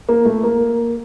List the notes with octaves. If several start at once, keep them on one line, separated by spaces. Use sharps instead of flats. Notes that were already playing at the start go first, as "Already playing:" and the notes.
A#3
A3
A#3